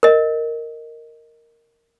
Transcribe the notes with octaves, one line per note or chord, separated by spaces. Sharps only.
A#4 D#5